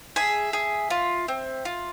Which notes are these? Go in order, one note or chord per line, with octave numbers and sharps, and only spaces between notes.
G#4 E5
G#4
F4
C4
F4